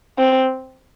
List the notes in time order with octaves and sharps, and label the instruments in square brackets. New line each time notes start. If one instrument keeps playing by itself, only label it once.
[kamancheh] C4